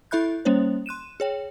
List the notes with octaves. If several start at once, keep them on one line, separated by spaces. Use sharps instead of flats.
E4 A4 E5 B5 F#6 G6
G3 A#3 C#4 C5 C#5
C6 F#6 D#7 E7
G#4 C#5 G5